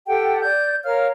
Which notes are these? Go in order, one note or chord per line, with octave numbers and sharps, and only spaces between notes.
G4 A4 F#5 G5
D5 G6
A#4 C#5 F5 F6